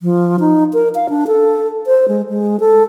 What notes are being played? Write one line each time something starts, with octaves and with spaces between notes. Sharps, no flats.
F3
D#4
A#4
F5
D4
A4
C5
G#3
G#3
A4